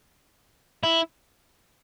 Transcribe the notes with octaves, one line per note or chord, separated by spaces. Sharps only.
E4